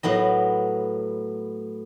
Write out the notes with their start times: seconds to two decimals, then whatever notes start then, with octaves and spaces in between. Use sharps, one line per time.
0.03 A2 F#3 B3 D#5